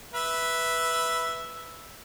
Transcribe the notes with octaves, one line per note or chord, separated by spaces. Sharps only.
B4 E5